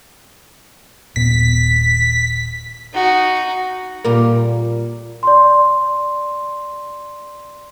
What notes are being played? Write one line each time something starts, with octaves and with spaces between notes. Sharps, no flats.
D#1 A#2 B3 B6
D#4 F#4
A#2 G3 A#4
D5 C6